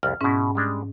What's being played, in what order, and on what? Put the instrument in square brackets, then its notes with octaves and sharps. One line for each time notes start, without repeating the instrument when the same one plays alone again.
[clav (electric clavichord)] C2 F2 [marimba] F6
[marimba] G#2 C#4 [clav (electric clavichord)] B2 E4
[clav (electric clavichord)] G3 G#3 D4